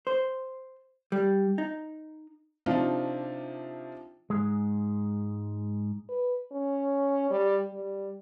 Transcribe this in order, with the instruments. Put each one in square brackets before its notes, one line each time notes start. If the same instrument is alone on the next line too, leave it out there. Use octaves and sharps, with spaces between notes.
[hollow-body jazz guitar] C5
G3
D#4
[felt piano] C3 F3 D4 D#4 F4
[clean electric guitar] G#2 G#3
[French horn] B4
C#4
G3
G3